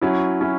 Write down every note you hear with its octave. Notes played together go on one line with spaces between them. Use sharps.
F#3 C#4 E4
F#3 C#4 E4